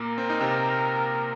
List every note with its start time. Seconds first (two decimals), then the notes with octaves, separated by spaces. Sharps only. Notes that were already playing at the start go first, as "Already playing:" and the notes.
Already playing: A#2 A#3 A#4
0.18 C4
0.30 D#4
0.40 C3 C4